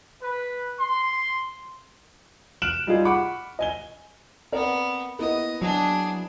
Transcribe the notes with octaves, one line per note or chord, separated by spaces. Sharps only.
B4
C6
F6 F#6 D7 E7 F#7
G3 D#4 F4 G#4
F#5 B5 C#6 D6
D#5 G#5 G7
B3 C4 A#4 D5
A#3 B3 E4 D#5
F#3 D4 G#4